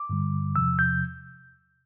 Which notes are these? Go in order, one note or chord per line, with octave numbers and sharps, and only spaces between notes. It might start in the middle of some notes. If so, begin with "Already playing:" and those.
Already playing: D6
G2 D3 G3
E2 C3 F3 E6
G6